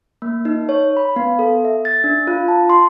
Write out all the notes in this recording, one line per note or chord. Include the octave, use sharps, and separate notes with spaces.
A#3
D#4
C#5
B5
B3
A4
E5
A6
D4
F4
A5
C6